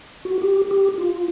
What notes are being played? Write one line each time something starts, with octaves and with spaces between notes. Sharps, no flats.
F#4
G4
G4
F4